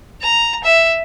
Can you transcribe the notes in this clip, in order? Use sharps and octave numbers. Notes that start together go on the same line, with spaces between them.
A#5
E5